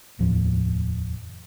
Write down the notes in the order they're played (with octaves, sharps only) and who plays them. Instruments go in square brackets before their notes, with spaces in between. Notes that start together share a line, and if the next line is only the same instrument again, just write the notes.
[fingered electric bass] F1 D#2 A2 F3